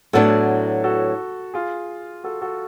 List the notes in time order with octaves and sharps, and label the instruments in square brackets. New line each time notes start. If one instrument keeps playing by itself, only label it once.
[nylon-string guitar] A2 F#3 B3 D4 [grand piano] F#4 A4
[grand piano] F#4 A4
F4 G#4
F#4 A4
F#4 A4